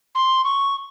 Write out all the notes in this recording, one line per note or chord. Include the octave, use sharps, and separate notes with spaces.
C6
C#6